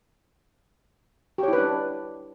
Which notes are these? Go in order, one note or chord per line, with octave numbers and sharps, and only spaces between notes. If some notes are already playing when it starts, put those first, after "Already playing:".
D4 E4 G4 B4 C#5